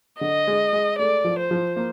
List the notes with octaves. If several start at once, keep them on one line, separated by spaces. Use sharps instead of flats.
D3 D#5
G#3
G#3
A3 D5
F3
C5
F3
A#3